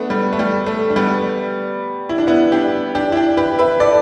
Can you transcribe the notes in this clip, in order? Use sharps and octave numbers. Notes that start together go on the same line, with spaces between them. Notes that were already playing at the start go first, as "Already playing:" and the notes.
Already playing: A3 B3 D4
G3
A3
G3
A3
D4
G3 B3
E4
D4
B3 E4
D4 G4
D4 G4
E4
D4 G4
G4 B4
B4 E5
A4 D5